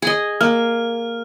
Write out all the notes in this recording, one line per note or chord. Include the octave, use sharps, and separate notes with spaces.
G#4 D#5
A#3 F6